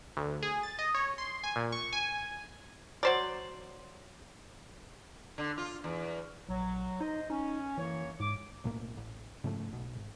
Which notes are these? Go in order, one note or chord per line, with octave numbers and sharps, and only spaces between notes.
D2
G#4
A6
D#5
C#5
C6
G#5
A#2
C#6
G#5
F#3 C5 D5
D3
F4
E2
A#1 F#3
D#4 C5 D#5
C#4 D#4
F#2 E3 A#3 C#5
G#2 D6
B1 A2 A#3
A1
G#2 C#3 F3 A3
B1 B2
G#1